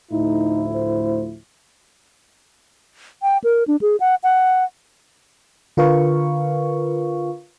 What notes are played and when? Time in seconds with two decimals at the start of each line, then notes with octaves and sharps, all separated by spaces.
0.12 D2 A2 F3 D#4 E4
0.75 C5
3.22 G5
3.44 A#4
3.68 D4
3.81 G#4
4.00 F#5
4.23 F#5
5.77 D3 F4 A#4 B4 F5 C#6